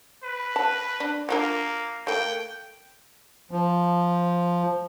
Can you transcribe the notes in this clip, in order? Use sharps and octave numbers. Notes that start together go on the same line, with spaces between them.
B4
A5
D4
A#3 D4 F4 A#4
A3 A#3 G5
F3